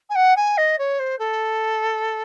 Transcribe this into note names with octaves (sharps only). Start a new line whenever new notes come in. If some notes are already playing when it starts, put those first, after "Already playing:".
G#5
F#5
G#5
D#5
C#5
C5
A4